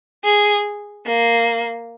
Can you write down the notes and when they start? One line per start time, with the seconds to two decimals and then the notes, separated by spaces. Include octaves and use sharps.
0.24 G#4
1.06 A#3